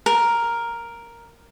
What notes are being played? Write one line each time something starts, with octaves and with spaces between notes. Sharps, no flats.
A#4